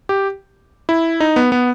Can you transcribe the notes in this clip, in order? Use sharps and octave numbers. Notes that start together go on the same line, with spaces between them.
G4
E4
D#4
B3
B3